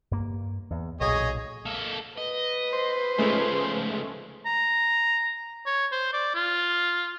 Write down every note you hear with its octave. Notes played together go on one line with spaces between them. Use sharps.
G2 A#3
E2
B1 A#2 G#4 C#5 D#5
A#3 A4
B4 D#5
C5
C#2 F3 G#3 A3 C#4
A#5
C#5
C5
D5
F4